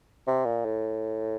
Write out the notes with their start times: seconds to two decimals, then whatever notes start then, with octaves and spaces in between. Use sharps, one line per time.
0.27 C3
0.45 A#2
0.65 A2